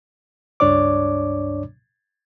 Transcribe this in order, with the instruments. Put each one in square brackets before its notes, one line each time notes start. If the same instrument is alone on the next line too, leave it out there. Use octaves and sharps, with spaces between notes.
[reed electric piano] C#2 G2 D4 C#5 D5 D6